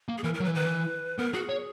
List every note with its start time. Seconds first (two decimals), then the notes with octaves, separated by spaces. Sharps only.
0.09 A#3
0.18 G#4
0.24 E3 A#4
0.34 A#4
0.40 F#3
0.44 B4
0.48 E3
0.55 D#3 B4
0.66 E3
1.18 B3 A#4
1.33 F#4 G#4
1.49 C#5